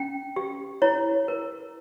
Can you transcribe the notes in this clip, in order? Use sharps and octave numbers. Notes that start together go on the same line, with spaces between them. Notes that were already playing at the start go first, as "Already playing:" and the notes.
Already playing: C#4 G5
G4
E4 C#5
A#4